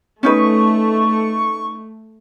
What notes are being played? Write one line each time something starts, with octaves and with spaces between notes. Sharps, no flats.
A3 C#4 D#4 B4 C#6